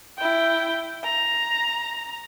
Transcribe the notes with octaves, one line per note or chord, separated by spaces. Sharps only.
E4 G5
A#5